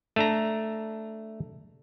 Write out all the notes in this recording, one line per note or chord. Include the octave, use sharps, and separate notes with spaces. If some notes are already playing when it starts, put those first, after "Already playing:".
A3 D4 A#5